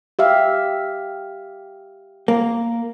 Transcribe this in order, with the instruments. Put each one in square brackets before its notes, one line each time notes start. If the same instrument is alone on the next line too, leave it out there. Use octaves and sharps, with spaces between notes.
[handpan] G4 E5 F5
[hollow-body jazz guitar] A#3